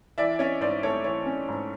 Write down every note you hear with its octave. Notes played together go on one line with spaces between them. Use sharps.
E3 D5 E5
C#4 C#5 D#5
G#2 C5 D5
A3 C#5
E3 C#5
C#4
G#2